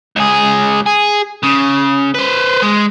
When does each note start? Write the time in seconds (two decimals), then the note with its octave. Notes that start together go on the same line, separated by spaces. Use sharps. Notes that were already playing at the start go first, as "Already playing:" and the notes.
0.16 C#2 G#4
0.86 G#4
1.43 C#3
2.14 B4 C5
2.62 G#3